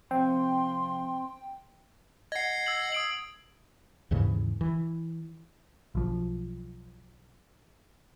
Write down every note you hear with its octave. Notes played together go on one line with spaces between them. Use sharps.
F2 C3 C4 G5 C6
D#5 F#5 G#6 C7
E6 G#6 F#7
D#6 D7 F#7
D#2 G#2 C#3 E3
E3
B1 F3